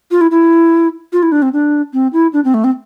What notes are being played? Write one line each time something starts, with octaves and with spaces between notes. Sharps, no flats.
F4
E4
E4
F4
E4
D4
C4
D4
C4
E4
D4
C4
A3
C4